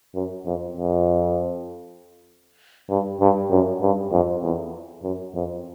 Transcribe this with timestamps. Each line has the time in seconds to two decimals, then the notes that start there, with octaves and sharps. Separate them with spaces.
0.14 F#2
0.45 F2
0.77 F2
2.89 G2
3.21 G2
3.51 F#2
3.81 G2
4.12 F2
4.43 E2
5.03 F#2
5.35 F2